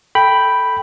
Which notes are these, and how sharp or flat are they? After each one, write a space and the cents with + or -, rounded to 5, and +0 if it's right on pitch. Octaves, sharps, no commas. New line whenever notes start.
A4 +0 G5 +0 B5 +0